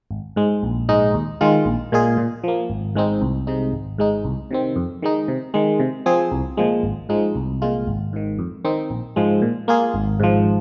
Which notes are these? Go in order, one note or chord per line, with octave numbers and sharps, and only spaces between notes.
G#1
G#2 G#3
A#1
G#2 G#3 D#4
D#2
D#3 G#3 F4
A#1
A#2 G#3 F4 G#4
A#2
F3 A#3
G#1
G#2 G#3 C4 D#4
C2
C3 G#3 D#4
G#1
G#2 G#3 D#4
C2
C3 D#3 C4
F2
D#3 G#3 D#4
C3
D#3 G#3
C3
F3 C4 G#4
C2
A#2 F3 G#3
G#1
G#2 F3 G#3 D#4
C2
A#2 G#3 F4
G#1
G#2 D#3
F2
D#3 C4 D#4
A#1
G#2 F3 G#3
A#2
A#3 F4 G#4
G#1
G#2 F3